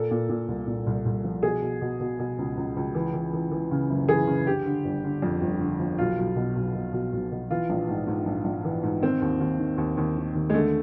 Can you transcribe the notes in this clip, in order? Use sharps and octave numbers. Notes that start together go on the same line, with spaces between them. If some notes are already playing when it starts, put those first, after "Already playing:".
Already playing: A#2 A4
A#2
A#2
C2
A#2
C2
C2
F3
B2 G#4
B2
B2
B2
B2
C#2
C#2
C#2
E3
E3
E3
E3
C#3
F#1
E3 G#4
C#3
D3 G4
D3
G1
D3
F2
G1
D3
F3
B1 F4
B1
B2
B1
B2
B2
B1
B2
E3 F4
A#1
G#2
G#2
A#1
A#1
E3
G#2
D#3 C4
D#2
D#2
D#3
D#2
D#2
D#3
D#2
G#3
D3 A3